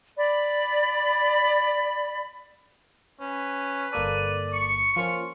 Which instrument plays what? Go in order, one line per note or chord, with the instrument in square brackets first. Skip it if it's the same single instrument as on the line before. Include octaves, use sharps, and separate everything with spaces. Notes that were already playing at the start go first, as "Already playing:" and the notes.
[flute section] D5 B5
[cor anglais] C#4 [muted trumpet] B4
[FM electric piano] G1 A#3 A4 [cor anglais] D5 [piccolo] D#7
[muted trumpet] C#6 [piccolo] C#7
[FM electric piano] F3 A#3 C#4 [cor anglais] F4